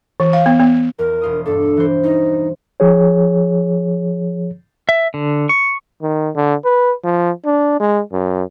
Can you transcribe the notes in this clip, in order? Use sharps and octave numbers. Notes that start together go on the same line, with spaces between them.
E3
F5
B3
B3
E2 A#4
E1 F4 D#6
G2 D4 A4
E3 C5
D#4
F3 G#4 C#5
E5
D3
C#6
D#3
D3
B4
F3
D4
G#3
F#2